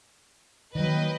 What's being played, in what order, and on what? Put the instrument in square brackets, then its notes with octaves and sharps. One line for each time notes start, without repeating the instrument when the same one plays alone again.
[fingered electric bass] D#3 [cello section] F#3 A#3 [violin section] B4 D#5 G5